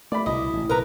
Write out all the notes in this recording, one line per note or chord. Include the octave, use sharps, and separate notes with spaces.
A3 D5 B5
C2 B2 E4 D#5
A1
B1 B2 D#3 A#4 B4 A#5